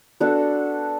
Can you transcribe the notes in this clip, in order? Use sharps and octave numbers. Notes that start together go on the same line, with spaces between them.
B3 D4 F#4 A4